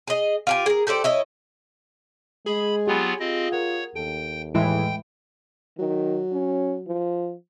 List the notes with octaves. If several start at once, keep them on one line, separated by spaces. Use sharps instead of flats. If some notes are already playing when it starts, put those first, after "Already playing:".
G#4 D#5
F4 G4 G#5
G#4 A#4
G4 A4 C5 D5
E4 C#5 D#5
G#3 G#4 B5
F#3 B3 F4 G4 G#5 B5
C4 F4 D#5
A#4 C#5 F#5
D#2 A4 G5
A2 E3 G#3 E4 G5
D#3 F#3
C#4
F3